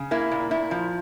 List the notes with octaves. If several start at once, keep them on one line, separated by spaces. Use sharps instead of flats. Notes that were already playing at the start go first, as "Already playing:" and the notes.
Already playing: C#3
A#3 E4
A#2
A#2 E4
F3